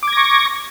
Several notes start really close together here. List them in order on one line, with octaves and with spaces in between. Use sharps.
D6 G#6 A#6 C#6